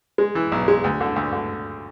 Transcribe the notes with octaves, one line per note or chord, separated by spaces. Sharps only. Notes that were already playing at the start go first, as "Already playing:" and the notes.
G#3
E3
B1
G#3
D2
D3
D2
D3